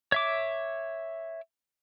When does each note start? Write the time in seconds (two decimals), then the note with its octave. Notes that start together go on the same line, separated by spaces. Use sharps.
0.12 C#5 E5 D6